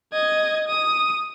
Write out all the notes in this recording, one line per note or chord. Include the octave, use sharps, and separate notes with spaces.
D#5 G#6
D#6